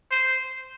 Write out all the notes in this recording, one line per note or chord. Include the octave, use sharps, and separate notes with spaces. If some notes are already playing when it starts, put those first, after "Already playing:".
C5